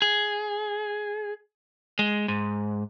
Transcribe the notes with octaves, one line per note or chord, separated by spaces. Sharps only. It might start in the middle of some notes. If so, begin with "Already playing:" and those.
G#4
G#3
G#2